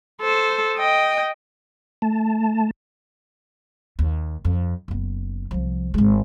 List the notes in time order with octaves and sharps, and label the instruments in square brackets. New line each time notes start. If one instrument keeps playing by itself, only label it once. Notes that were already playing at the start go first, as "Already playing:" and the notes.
[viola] A4 C5
D#5 G5
[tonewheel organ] A3 A5
[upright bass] D#2
F2
F#1 B3
C2 F3
G#1 G#3